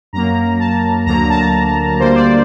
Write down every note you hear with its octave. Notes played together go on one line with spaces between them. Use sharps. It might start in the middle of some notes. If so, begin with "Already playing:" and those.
F#2 F#3 A#3 A#5
A5
D2 D3 F#3 A#3 A#5
A5
D2 D3 G3 A#3 C5
D5